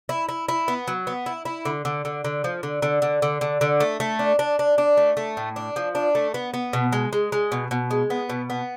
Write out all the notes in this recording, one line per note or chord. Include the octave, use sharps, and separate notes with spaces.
E4
E4
E4
B3
F#3
B3
E4
E4
D3
D3
D3
D3
F3
D3
D3
D3
D3
D3
D3
A3
A3
D4
D4
D4
D4
A3
A3
A2
D4
F3
D4
A3
B3
B3
B2
G#3
G#3
G#3
B2
B2
G#3
B3
B2
B3